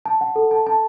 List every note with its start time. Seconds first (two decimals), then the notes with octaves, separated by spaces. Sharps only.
0.06 A5
0.21 F#5
0.36 A4
0.51 A5
0.66 A5